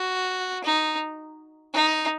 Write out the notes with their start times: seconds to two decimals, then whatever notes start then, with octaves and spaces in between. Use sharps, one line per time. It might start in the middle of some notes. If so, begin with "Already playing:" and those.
Already playing: F#4
0.64 D#4
1.74 D#4